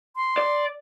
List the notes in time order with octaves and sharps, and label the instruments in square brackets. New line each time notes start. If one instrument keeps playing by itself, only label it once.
[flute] C6
[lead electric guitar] D5